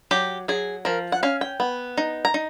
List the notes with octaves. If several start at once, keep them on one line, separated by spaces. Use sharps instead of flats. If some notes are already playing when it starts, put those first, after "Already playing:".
F#3 G4
F#3 G#4
F3 A#4
F#5
C#4 F5
G5
B3
D#4
A#5
D#4